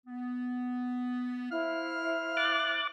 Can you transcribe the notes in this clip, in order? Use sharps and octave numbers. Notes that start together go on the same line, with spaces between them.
B3
E4 C5 E5 F5 F6
D6 F#6 A6